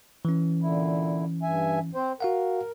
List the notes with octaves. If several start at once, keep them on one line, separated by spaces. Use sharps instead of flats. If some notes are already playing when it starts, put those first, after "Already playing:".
E3 C#4
A#2 D3 E4
G2 E5 G#5
C4 C5
F#4 A#4 F5 F#5